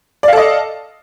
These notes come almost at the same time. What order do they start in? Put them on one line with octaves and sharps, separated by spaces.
D5 F5 A4 D#5